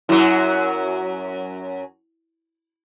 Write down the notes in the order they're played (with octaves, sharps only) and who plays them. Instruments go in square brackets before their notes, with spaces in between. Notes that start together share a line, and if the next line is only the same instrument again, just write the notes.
[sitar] F#2 F#3 [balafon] E4